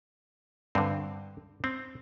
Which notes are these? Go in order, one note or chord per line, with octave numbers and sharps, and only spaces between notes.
G2 D3 C4
C4